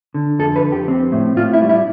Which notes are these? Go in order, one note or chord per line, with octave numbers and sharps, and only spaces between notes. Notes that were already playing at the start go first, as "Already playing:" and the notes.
D3
F2 A4
B4
F2
G4
C4
A2
A2 F4
E4
G3
E4